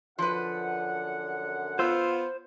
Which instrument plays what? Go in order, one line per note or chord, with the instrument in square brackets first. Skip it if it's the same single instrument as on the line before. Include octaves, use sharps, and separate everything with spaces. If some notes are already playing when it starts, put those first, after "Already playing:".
[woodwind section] F#2 D3 F#5 [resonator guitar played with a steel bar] F3 B4
[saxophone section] B3 F4 [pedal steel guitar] C5 C6 E6